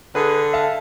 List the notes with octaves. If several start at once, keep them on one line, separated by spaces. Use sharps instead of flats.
D3 G#4 B4
E5 F5 A5